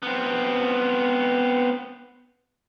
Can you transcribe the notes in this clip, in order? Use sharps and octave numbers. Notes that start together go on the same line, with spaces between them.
B3 C4